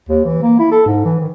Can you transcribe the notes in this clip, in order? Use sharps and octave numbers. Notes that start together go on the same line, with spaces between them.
D#2
E3
A#3
E4
A4
G#2
E3
D#3